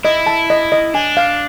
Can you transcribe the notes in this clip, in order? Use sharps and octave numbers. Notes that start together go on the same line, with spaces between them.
E4 D#5
A5
D#5
D#5
D4 G#5
F5